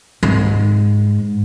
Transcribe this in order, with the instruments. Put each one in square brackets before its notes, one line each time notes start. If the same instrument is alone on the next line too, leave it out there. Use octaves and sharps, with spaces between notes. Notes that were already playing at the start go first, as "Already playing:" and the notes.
[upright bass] G#2